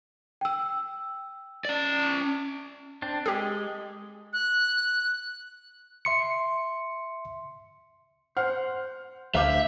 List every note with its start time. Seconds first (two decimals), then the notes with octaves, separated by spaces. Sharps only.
0.41 G5 E6
1.65 C#4 D5
3.02 C4 D4
3.26 G#3 G4 G#4
4.33 F#6
6.05 E5 C6 C#7
8.37 C5 F#5 F6
9.35 D2 E5 F5 D6 G6